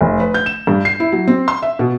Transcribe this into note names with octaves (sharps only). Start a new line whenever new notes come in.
F1
B4
G6
E7
G2
C7
E4
F#3
C4
C6
E5
B2